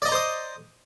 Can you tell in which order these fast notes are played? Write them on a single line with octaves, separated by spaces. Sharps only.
D5 D#5 A#5 C5 D#6